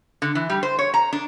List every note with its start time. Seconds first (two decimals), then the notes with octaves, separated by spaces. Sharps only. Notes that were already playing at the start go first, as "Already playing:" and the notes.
0.22 D3
0.35 E3
0.50 G3
0.63 C5
0.79 C#5
0.94 A#5
1.13 D4